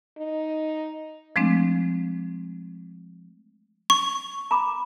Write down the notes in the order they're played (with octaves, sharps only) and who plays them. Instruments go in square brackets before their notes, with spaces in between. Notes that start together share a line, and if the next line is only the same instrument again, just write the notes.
[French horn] D#4
[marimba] F3 G#3 A3 C4 D4
[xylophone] C#6
[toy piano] A#5 B5 D6